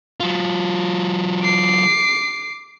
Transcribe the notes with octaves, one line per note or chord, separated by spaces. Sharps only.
F#3 F4
D6 C7